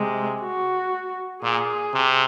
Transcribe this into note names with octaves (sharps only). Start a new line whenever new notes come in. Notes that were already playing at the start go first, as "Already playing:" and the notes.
Already playing: C3 G#3
F#4
A#2 G#4
C3